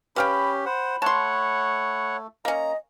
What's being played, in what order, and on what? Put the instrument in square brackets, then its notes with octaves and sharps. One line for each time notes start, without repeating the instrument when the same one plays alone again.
[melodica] C#4 G4 [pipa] B4 F5 G5 [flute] B5
[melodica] C5 F#5 [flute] B5
[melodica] A3 [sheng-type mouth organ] C#5 F#5 [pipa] A5 C6
[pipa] A#3 C#4 [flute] D#5 [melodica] A#5